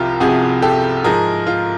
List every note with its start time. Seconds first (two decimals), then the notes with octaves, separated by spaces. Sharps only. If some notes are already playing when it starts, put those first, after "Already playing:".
Already playing: C2 C3 F3 F4 G4 A#4
0.20 C2 C3 F3 F#4 G#4
0.62 G4 A4
1.04 G#2 F3 G#4 A#4
1.47 F4